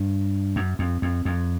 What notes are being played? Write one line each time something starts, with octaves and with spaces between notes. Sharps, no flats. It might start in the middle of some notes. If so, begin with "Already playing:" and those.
Already playing: G2
F#2
F2
F2
F2